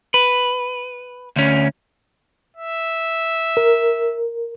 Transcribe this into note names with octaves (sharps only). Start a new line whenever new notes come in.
B4
D2 C#4
E5
A#4